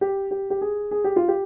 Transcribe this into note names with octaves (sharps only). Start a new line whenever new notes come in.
G4
G4
G4
G#4
G#4
G4
F4
G4